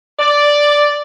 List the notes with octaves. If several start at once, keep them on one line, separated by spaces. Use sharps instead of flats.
D5